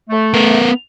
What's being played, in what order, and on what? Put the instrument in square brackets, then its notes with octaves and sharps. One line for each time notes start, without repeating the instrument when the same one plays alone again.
[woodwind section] A3
[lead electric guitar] B3 A#4